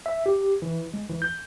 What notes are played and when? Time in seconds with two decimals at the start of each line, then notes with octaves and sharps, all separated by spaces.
0.06 E5
0.26 G4
0.62 E3
0.94 G#3
1.10 E3
1.22 G6